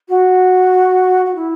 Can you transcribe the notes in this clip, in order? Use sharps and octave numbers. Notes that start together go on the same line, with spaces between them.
F#4
F#4
E4